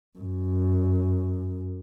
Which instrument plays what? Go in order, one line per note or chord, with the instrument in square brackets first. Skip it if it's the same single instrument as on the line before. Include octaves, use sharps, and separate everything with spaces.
[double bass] F#2